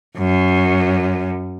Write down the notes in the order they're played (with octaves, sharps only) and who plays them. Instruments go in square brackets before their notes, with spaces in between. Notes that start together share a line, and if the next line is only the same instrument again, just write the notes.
[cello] F#2